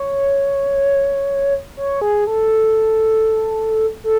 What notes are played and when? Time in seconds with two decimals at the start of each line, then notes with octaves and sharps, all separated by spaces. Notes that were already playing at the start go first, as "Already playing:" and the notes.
Already playing: C#5
1.77 C#5
2.01 G#4
2.27 A4
4.04 A4